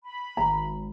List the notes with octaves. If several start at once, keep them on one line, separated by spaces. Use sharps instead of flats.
B5
G#1 A#5